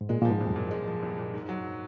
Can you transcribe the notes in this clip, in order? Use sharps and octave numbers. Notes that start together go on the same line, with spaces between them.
G#2
A#2 G#3
A#2
F3
G#2
C2 F2
F#2
A#2
G#3
F3
C2
A#2
G#2
F#3